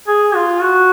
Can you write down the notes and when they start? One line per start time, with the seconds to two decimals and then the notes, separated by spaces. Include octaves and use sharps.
0.08 G#4
0.35 F4
0.62 F#4